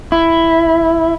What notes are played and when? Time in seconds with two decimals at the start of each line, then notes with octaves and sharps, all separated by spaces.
0.12 E4